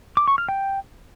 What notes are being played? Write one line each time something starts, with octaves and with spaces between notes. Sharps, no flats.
D6
C#6
F6
G5